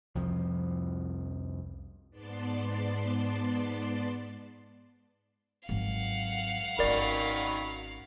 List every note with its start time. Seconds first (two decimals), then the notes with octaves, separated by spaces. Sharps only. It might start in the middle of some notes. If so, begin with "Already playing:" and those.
0.15 C2 F2 F3
2.10 G#2 B3 D5 A5 C6
5.69 G#1 F#3 F5 F#5
6.79 G#1 D#3 F#3 C#4 A#4 D5 B5